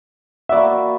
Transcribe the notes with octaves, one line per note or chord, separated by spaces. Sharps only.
A#3 E4 F#4 D5 E5